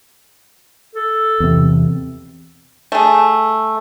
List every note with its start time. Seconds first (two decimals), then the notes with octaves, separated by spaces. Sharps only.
0.95 A4
1.40 E2 C3
2.92 A3 G#4